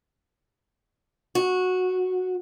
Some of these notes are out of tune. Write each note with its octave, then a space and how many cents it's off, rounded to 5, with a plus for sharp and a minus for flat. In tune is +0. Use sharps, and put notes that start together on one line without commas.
F#4 -10